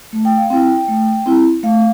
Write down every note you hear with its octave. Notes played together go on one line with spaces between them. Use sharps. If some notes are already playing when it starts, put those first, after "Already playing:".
A3
G5
F5
C4 E4 G5
A3
C4 E4
A3 F5